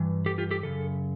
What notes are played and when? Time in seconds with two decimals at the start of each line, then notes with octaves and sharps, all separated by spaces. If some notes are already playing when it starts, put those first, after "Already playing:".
Already playing: G2 E3
0.26 G4 A4
0.38 F4 G4
0.51 G4 A4
0.63 F#2 C#3 A4